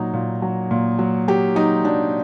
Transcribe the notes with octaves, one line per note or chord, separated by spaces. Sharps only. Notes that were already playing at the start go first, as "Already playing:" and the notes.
Already playing: A#2 F#3 D#4
A#2
F#3
A#2
F#3
F#3 G4
F#3 D#4
F#3 D4